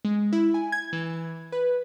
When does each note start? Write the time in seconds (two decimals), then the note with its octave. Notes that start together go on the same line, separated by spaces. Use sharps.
0.05 G#3
0.33 E4
0.54 G#5
0.72 G#6
0.93 E3
1.52 B4